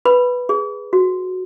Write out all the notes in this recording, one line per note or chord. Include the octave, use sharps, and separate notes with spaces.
B4 B5
G#4
F#4